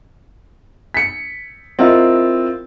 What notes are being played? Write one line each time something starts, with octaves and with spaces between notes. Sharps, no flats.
B6 C#7
C4 E4 F4 A#4 D#5 F5